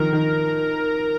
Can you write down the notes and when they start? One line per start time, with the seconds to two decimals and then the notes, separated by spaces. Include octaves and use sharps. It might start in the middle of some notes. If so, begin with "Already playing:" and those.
Already playing: D#3 F3 A#4
0.13 D#3